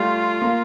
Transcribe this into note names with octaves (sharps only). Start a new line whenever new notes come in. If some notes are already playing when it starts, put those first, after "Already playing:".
Already playing: G3 A3 F4
A#3